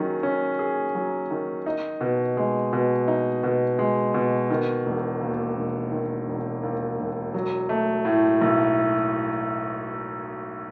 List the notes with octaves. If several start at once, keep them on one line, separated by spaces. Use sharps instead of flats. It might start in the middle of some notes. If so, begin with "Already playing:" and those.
Already playing: D#3 F#3 C#4 G#4
C#4
G#4
F#3
D#3
D#4
B2
G#3
B2
D#4
B2
G#3
B2
D#3
E1
D#2
E1
D#3
E1
D#2
E1
F#3
A3
A2
B1